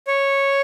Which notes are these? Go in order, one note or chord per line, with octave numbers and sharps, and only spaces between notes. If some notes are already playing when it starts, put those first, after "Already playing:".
C#5